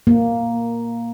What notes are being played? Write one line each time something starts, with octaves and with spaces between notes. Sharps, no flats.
A#3